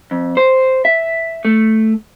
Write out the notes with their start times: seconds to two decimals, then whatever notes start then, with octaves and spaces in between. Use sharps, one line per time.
0.11 F2
0.37 C5
0.85 E5
1.45 A3